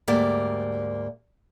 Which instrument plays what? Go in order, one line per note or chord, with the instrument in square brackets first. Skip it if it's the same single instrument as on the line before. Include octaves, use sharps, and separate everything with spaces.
[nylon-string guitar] D2 G#2 A#3 G4 D5